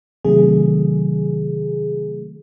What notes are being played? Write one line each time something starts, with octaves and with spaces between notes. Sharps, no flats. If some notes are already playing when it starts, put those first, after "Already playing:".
C3 D#3 F#3 A3 G#4